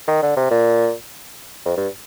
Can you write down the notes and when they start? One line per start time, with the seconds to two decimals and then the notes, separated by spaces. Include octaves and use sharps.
0.08 D#3
0.22 D3
0.36 C3
0.50 A#2
1.66 F2
1.77 G2